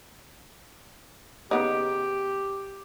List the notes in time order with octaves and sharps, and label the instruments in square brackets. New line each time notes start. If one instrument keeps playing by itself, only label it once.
[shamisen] C#3 B3 D#4 [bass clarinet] G4